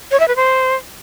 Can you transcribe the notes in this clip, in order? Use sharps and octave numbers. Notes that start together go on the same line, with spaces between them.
C#5
E5
B4
C5